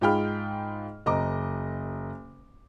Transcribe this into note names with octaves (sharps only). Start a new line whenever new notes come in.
G#2 F4 G#4 G5 B5 F6
F#1 D#5 A#5 D6